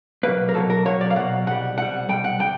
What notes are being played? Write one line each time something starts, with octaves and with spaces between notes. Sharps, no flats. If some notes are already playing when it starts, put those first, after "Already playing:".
B2 F#3 A#3 B4
A#4
B2 F#3 A#3 A4
A#4
B2 F#3 A#3 C#5
D5
F5
B2 F#3 A#3 F#5
C2 B2 G3 F#5
C2 B2 G3 F#5
C2 B2 G3 G5
F#5
B2 G3 G5